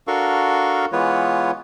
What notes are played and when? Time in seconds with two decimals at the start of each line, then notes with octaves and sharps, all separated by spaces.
0.07 D4 F#4 A4 A#4 F5 C#6
0.92 E3 G#3 B3 F4 B4 C#5